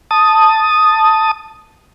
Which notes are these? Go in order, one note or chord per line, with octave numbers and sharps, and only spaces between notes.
A5 D#6